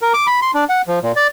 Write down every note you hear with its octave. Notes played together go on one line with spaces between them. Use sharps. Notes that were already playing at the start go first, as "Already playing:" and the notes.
A#4
D6
B5
C6
D4
F#5
F3
A#2
D5